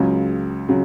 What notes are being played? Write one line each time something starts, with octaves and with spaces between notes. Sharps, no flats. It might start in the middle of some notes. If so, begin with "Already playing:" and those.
Already playing: C#2 C#3 F#3
C#3 F#3